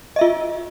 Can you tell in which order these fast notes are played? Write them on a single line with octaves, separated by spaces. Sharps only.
D#5 E5 F4